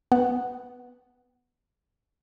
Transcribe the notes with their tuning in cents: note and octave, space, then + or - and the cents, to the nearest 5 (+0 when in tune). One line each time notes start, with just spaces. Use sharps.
B3 +0 F#5 +0